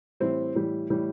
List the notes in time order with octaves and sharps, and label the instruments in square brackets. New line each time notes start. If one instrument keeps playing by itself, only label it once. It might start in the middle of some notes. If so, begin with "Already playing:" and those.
[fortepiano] A2 E3 G3 C4
A2 E3 G3
A2 E3 G3